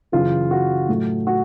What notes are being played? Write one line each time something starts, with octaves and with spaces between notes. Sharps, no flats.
F#2 C#3 E3 F4
F#4
A2 F#3 A3
F#4